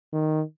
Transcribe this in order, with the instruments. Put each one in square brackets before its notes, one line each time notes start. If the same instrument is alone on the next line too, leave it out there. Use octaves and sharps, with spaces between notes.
[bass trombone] D#3